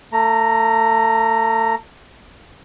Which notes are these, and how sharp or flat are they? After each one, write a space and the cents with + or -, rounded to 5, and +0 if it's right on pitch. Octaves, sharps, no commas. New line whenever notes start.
A3 +30 A#5 +0